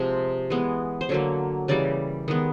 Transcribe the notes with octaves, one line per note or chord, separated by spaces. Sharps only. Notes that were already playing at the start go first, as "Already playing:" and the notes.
Already playing: C3 F3 G#3
E3 G#3 B3
C5
D3 F#3 A#3 C#5
C#3 E3 G3 D5
D#3 G#3 B3